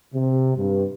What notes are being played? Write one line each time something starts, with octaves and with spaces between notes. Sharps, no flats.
C3
G2